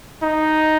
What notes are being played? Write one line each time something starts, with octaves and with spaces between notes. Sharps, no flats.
D#4